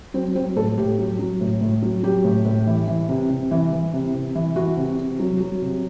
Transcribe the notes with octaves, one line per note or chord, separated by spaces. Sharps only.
F#3 C4
F#3 C4
A2 A4
A2 G4
F#3
F#3
A2
A2
F#3
F#3 G4
A2
A2
E3
E3
C3
C3
E3
E3
C3
C3
E3
E3 F#4
C3
C3
F#3
F#3
C3